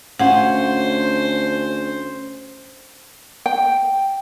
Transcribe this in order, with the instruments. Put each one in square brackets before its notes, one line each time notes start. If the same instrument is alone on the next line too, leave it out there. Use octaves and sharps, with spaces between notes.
[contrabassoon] D2 [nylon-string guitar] C#4 F5 [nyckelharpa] C5 [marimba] F#5
[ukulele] G5